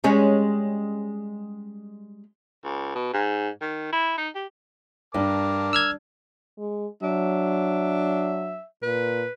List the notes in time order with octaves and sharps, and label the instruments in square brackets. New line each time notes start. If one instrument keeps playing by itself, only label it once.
[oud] G3 G#3 C#4
[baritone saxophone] C#2
B2
G#2
D#3
E4
D#4
G4
[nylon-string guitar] G2 [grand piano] D4 [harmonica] A#4 A5 D6
[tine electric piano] E6 F6 G#6
[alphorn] G#3
[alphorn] F#3 [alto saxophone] D4 [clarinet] E5
[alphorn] A#2 [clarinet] B4